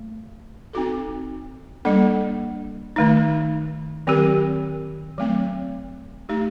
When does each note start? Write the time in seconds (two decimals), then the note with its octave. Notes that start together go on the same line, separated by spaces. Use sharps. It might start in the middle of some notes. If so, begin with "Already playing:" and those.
Already playing: A3
0.73 C4 D#4 F#4 A4
1.85 G3 A#3 D4 A4
2.96 D#3 A3 D#4
4.07 D#3 F#3 C4 G4 A#4
5.18 F#3 A3 C4
6.29 A3 D#4 G4